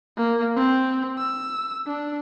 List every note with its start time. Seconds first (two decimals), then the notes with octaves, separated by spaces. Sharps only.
0.17 A#3
0.56 C4
1.18 E6
1.87 D4